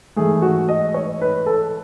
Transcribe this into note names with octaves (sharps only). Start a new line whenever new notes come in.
G#2 E3 A3 G#4
F#4
D#5
C#5
B4
A4